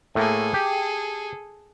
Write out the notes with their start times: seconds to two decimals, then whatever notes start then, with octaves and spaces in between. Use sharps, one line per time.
0.15 A2 A3 A#3 G#4 A4
0.54 G4